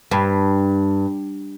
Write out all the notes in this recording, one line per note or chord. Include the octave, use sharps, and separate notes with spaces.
G2